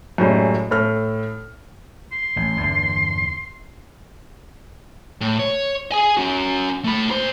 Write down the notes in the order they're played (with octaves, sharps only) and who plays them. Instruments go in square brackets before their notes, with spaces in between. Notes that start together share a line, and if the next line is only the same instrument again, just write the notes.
[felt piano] F#2 A2 G3 G#3
A2 A4 F6
[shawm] C6
[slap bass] A1
E2 G2 D3
[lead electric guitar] A2
C#5
G#4 G#5
C#4 F#4
A3 B5
A#2 C5